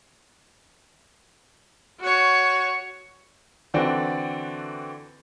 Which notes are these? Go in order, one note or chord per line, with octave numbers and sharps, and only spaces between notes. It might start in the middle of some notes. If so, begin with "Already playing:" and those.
F#4 C#5
D3 E3 C4 F#4 A4 D5